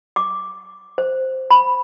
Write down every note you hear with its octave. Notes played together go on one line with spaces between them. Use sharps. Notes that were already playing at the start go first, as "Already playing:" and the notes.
D6
C5
B5